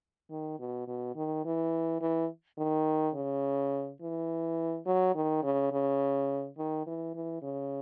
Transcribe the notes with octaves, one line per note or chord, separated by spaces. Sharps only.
D#3
B2
B2
D#3
E3
E3
D#3
C#3
E3
F#3
D#3
C#3
C#3
D#3
E3
E3
C#3